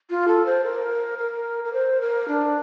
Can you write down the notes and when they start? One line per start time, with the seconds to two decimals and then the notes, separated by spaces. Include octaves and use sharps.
0.10 F4
0.28 A4
0.46 C5
0.64 A#4
1.18 A#4
1.64 A#4
1.73 C5
2.01 A#4
2.28 D4